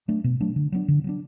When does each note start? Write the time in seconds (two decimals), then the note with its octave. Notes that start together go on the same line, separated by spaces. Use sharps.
0.08 F#3 A3 D4
0.24 B2
0.40 F#3 A3 D4
0.56 D3
0.72 F#3 B3 D4
0.88 D3
1.04 F#3 B3 D4